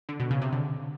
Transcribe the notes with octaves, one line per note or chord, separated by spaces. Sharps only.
D3
B2
C#3
C3
D3